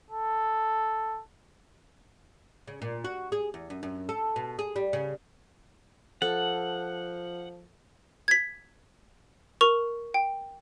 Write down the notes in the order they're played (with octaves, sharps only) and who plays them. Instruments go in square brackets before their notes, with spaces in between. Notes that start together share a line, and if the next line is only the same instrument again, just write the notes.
[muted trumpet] A4
[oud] C#3
A#2
F#4
G#4
E2
F#2
F#2
A4
B2
G#4
G3
C#3
[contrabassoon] F3 [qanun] A4 [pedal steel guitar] F#5
[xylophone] G#6 B6
A#4 C#6 F7
G5